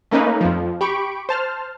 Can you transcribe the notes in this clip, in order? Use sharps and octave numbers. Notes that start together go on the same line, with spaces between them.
A3 A#3 C#4 D#4 B4
F2 F3
G4 B5 C#6 D7
C5 A5 F6